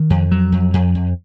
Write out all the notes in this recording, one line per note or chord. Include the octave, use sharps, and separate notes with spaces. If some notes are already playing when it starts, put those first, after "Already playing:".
Already playing: D#3
F2
F#3
F2
F2
F2